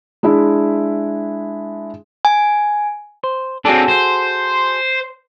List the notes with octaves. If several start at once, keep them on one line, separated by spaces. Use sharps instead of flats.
G#3 D4 E4 E5
G#5
C5
C4 D4 F#4 G#4 A4
C5